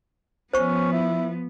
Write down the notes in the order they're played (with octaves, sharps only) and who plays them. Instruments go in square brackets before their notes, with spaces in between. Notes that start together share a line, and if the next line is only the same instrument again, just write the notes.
[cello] F3 B3 [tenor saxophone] C#4 [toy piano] C5 C#6
[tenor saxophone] E4